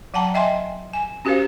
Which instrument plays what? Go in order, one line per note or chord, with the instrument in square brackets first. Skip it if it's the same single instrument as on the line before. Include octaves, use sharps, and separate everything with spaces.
[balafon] F#3 F#5 G5 A5 A#5
D#5 E5 G5 G#5 C6
G#5
C#4 F#4 G4 A#4 C5 F5